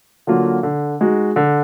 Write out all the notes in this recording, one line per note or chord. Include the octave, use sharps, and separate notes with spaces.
D3 F#3 A#3 F4
D3
G#3 D#4 F#4
D3